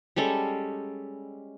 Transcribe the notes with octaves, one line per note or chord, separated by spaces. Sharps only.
G3 G#3 C#4 A4